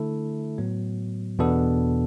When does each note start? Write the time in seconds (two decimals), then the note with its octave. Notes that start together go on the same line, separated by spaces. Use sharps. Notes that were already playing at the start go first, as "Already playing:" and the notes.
Already playing: D3 A3 E4 A4
0.58 A2 F#3 B3
1.39 E2 B2 B3 D4 A4